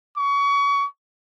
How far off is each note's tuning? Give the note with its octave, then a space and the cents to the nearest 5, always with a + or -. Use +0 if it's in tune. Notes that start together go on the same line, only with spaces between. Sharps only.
C#6 +30